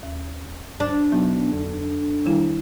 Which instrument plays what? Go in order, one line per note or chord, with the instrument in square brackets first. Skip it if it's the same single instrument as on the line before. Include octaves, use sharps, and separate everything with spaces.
[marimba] D#2
[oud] D4
[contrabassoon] B2 [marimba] F#3 D#4
[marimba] F2 [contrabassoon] D3
[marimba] D#3 G3 E4